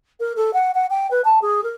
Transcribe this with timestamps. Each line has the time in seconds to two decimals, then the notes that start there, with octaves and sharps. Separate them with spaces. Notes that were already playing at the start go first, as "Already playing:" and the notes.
0.20 A#4
0.36 A4
0.53 F#5
0.74 F#5
0.90 G5
1.11 B4
1.25 A5
1.42 G#4
1.64 A#4